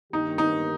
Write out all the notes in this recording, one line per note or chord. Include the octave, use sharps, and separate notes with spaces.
G2 D#3 A#3 D#4 G4
D#4